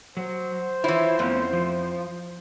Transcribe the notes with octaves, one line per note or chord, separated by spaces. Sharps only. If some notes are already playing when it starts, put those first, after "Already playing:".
F#3 C5
E3 E4 F4 C#5
F2 A3 B3 C#4
F3